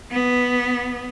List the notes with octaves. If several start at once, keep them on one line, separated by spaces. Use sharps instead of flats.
B3